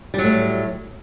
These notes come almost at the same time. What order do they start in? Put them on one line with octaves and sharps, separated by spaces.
G3 F#3 A2